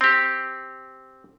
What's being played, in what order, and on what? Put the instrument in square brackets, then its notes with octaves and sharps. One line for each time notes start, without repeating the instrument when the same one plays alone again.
[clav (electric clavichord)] C4 G4